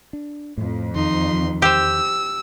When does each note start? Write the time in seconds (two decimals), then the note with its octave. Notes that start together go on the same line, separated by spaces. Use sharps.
0.13 D4
0.58 F2 A2
0.95 E2 D#3 D#4 C6
1.62 G4 C5 E6